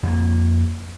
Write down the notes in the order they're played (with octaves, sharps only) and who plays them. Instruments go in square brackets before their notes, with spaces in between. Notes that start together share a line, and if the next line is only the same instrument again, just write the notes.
[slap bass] F2 A#3